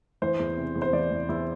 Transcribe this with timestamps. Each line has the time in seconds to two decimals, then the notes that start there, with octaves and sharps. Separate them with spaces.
0.22 E3 C5
0.39 E2
0.57 C3
0.76 E2
0.82 C5
0.93 E3 D5
1.11 E2
1.29 E2 E4